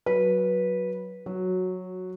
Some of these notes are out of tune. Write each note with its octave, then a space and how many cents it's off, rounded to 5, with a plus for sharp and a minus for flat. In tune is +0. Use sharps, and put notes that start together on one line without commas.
F#3 +0 B4 -15
F#3 -10 F#4 +0